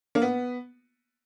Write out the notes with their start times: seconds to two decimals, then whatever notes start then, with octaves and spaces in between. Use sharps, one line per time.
0.15 A#3
0.22 B3